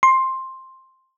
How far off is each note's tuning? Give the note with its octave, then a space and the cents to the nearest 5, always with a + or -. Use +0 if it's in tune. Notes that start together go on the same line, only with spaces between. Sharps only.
C6 +10